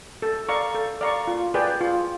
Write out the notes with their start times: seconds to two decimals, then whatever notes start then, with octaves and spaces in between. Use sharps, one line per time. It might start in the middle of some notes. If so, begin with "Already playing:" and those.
0.22 A4
0.49 D5 F5 A#5 C#6
0.75 A4
1.01 D5 F5 A#5 C#6
1.28 F4
1.54 G#4 B4 D5 G5
1.81 F4